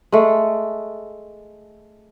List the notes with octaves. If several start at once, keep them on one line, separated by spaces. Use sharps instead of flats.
G#3 A3